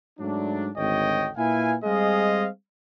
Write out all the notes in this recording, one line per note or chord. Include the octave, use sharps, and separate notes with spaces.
G#2 F#3 A3 D4
G#1 D2 D3 C#5 D#5 G5
A#2 E4 B4 F5 G#5
G3 G#3 C4 G#4 D#5 F5